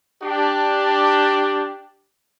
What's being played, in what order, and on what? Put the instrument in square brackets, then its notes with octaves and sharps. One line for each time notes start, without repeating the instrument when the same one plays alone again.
[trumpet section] D4 G4